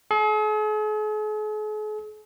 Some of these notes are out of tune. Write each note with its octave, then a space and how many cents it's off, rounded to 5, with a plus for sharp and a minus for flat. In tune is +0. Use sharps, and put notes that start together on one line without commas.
G#4 +45